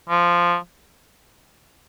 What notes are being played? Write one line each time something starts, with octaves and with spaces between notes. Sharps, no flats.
F3